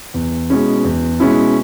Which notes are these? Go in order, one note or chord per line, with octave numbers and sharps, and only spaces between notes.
E2
B2 G#3 C#4 E4
E2
B2 G#3 C#4 E4